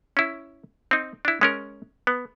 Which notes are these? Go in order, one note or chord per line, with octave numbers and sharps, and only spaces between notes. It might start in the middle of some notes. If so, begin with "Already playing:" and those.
C#4 E4
C4 D#4
D4 E4
G#3 C#4 A#4
B3